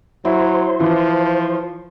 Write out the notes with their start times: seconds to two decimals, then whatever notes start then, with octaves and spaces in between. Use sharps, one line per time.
0.25 F#3 E4 C5 C6
0.80 E3 F3